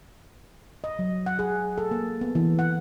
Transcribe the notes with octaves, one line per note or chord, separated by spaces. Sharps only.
D#5
F#3
F#5
G#4
A4
A#3
B3
E3
F#5